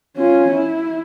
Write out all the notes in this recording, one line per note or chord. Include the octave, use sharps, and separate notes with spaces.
C#4 F4
E4